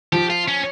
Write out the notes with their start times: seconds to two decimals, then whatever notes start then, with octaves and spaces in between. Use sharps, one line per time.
0.12 F3 G4
0.30 F4
0.48 C#4